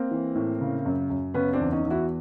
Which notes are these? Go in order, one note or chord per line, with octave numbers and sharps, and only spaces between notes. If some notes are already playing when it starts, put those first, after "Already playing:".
Already playing: A#3 C4
E3
A2
C#3
F#2
F#2
C#3 B3 C#4
C4 D4
E2
C#4 D#4
E2
E4 F#4